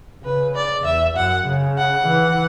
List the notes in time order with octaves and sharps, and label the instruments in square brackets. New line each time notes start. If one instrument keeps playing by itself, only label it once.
[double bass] C#3 [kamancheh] B4
[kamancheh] D5
[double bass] E2 [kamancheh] E5
[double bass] F#2 [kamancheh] F#5
[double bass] C#3
[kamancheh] F#5
[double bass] E3